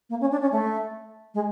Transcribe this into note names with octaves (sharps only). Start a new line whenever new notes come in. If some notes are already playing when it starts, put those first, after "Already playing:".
A#3
C#4
D4
C#4
A3
G#3